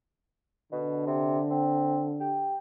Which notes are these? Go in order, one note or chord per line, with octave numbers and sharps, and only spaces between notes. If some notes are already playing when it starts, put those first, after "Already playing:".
B2 D3
C3
C4
G4